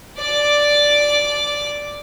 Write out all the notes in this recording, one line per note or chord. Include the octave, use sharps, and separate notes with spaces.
D5 D6